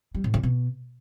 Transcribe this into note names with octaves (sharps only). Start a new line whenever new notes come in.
G3
A2
D3
B2